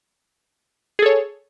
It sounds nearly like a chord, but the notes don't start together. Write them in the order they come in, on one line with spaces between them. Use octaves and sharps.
G#4 A4 C#5